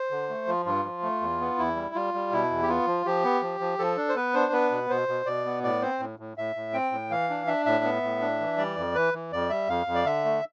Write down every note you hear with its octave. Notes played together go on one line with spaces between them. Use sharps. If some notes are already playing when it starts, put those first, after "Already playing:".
Already playing: C5
D3
A3
F3 F4
G2 F4
F3
A3
E2
B3
E2 E4
G3
G3 F4
G3
B2 E4
E2
G4
B3 F4
F3
F3 G4
B3
F3
F3
F3 A4
D4
C5
B3 B4
D4 C5
B3 B4
B2
B2 C5
B2
B2 D5
B3
A2 D5
C4 C5
A2
A2
A2 E5
A2
C4 G5
A2
E3 F5
D4
D4 E5
A2 E5
B3
A2
D4
E3
G3 D5
F2
E3 B4
E3
F2 D5
G3 E5
F2 F5
F2
D5
D3 E5
A3